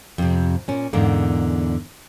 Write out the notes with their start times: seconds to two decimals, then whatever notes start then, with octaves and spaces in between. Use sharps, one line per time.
0.18 F2 C3
0.68 A#2 C#4
0.93 E2 G#2 D3 A#3